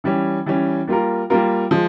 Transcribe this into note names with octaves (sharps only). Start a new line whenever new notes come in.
E3 G3 C#4
E3 G3 C#4
G3 A#3 F4 A#4
G3 A#3 F4 A#4
F3 G#3